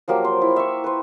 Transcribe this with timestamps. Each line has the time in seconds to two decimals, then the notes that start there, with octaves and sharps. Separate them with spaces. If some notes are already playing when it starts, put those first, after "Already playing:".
0.08 F3 F#3 A#3 G4
0.25 C5
0.42 E4
0.56 E5 C#6
0.84 B4 C5